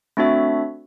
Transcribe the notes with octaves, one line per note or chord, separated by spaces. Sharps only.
A3 C4 D4 F#4 E5